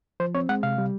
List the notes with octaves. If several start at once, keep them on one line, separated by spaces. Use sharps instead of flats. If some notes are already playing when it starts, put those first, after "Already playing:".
F3 C5
C4 C#5
G#3 F#5
C3 F5
G3